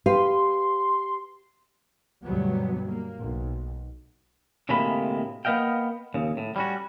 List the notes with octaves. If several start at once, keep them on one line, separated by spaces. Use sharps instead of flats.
G4 B4 F5 C6
D2 G2 B2 F#3 G3 B3
A#3
B1
D2 A2 C3 G#3 A#3 B5
A#3 B3 D4 D#5 F5 G5
D#2 C#3
A2
G3 C#4 F#4